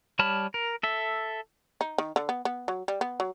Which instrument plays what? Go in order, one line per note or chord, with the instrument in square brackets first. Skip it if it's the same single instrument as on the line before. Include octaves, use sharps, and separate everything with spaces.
[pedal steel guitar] G3 C#5 A5 B5 F6
A#4
A4 E5
[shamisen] D#4
D#3
D3
B3
B3
F#3
G3
B3
F#3